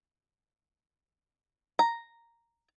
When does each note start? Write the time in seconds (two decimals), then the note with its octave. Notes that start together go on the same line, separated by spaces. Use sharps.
1.79 A#5